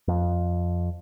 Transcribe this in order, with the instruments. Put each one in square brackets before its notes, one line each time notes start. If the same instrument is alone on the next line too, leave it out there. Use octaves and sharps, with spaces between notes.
[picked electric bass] F2